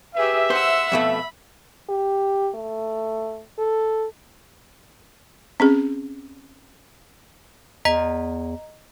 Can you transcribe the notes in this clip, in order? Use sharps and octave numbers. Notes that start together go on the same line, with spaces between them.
G4 G#4 B4 E5
C5 F#5 C6 E6
F2 B2 A3 B5
G4
A3
A4
C4 C#4 G#4
E2 D#5 A#5 B6